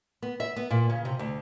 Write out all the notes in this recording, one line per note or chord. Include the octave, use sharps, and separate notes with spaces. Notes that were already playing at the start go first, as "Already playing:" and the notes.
B3
E5
B3
A#2
C#3
C3
D2